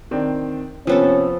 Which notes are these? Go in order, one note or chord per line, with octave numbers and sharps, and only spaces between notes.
D#3 C4 D4
C3 F3 B3 C#4 A4